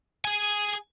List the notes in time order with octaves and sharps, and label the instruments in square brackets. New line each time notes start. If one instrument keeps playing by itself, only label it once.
[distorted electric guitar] G#4 G#5